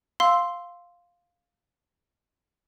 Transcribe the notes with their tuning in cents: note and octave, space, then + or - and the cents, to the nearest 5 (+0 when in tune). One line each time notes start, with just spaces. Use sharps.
F5 +5 C6 +0 E6 +0